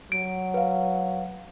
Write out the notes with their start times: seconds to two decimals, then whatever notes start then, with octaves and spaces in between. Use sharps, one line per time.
0.12 F#3 D7
0.54 B4 F5